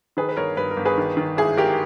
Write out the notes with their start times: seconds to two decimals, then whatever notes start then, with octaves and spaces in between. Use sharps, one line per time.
0.17 D#3 G#4 B4
0.29 B4
0.37 G1 A#4 C#5
0.57 G2 B4
0.71 A#4
0.77 G1
0.85 G#4 B4
0.98 D#3
1.17 D#3
1.37 G#1 E4 G#4
1.57 G#1 G4 A#4